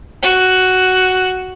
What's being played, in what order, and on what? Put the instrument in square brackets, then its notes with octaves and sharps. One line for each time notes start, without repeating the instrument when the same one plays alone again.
[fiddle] F#4